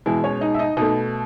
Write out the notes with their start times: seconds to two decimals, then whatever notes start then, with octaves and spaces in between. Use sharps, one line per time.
0.06 B2 E3 G#3 E4
0.24 C#4 C#5
0.41 D#4 D#5
0.54 E5
0.59 D#4 D#5
0.77 B2 A3 D#4 D#5